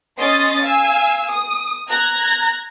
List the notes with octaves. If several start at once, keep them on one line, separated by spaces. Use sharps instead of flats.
C#4 D#5 C6 D#6 A6
F5 G#5 E6
D#6
A#5 F#6 G#6 A#6